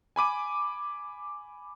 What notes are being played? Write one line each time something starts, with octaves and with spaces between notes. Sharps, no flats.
G#5 B5 D6 D#7